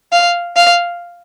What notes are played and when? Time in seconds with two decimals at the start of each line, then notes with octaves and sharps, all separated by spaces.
0.12 F5
0.57 F5